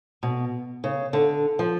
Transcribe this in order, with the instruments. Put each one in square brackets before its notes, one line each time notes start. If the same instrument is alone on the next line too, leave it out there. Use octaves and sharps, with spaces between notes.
[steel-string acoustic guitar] B2
C#3
D3
F3